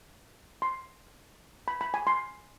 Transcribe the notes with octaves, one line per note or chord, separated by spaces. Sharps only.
C6
B5
B5
G#5
C6